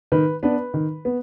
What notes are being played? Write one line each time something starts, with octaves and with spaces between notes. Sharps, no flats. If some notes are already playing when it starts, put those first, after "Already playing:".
D#3 B4
B3 D4 B4
D#3
B3